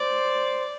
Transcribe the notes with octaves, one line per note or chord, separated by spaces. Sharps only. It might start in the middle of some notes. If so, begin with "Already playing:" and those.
Already playing: C5 D5